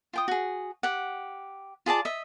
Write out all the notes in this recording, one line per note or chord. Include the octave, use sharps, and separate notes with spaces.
F4 G5 D#6
F#4 G#4
G4 F#5
F4 G#4 D5 A5
D#5 E5